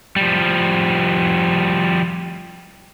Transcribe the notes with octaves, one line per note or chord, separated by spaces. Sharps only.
F3 G3